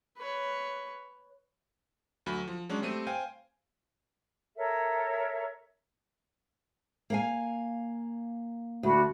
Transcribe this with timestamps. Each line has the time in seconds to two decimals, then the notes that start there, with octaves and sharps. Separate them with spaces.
0.18 B4 C#5
2.26 D2 F#3 B5
2.48 F3
2.69 F#3 G#3 C#4 D4
2.82 G3 A3 C4 D#7
3.07 C5 F5 G5 G#5
4.57 A4 A#4 C#5 E5
7.10 A#3 F5 G#5
8.83 D2 D4 F#4 B5